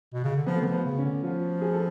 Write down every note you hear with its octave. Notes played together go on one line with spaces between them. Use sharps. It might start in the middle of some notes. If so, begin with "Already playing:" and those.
B2
C#3
D3
F3 B3
A3
D3 F3 B3
B3
C#3
C#4
D3
F3 F4
G#4
A4